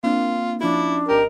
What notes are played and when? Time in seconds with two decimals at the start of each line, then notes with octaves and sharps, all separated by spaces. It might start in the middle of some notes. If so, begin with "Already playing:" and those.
0.04 A#3 C4 D4 F4
0.61 F3 C#4 D4 E4 F4
1.09 G#1 G4 A#4 D#5